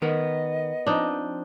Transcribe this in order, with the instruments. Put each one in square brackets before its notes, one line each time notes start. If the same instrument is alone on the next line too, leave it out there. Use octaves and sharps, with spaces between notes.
[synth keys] D#3 [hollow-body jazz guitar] B3 A#4 F#5 [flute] D#5
[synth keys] F3 C4 [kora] D4 D#4